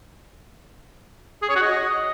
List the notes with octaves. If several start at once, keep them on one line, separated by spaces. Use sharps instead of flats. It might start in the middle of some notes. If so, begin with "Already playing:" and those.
G#4
C#5
F#4
D#5